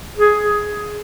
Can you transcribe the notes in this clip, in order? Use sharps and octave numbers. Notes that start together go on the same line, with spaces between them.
G#4